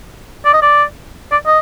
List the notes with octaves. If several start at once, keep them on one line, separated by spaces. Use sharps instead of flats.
D5
D#5
D5
D5
D#5